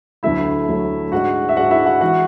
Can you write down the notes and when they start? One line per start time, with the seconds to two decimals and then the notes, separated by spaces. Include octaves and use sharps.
0.23 D2 D3 F#3 A3 E4 E5
0.68 D2 D3 F#3 A3
1.12 G#2 G#3 D4 F#4 F#5
1.49 E5
1.56 G#2 G#3 D4 F#4 F#5
1.71 E4 E5
1.86 F#4 F#5
2.01 E3 G#3 F#4 F#5